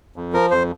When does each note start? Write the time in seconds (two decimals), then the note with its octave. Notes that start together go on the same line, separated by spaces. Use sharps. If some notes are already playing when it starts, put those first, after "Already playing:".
0.16 F2
0.33 F3 A#4
0.51 F2 C5